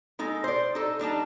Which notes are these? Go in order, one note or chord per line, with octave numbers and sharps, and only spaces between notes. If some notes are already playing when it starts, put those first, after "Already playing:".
G#3 D#4 A4
C5 D5
D#4 A4
G3 D4 D#4 A5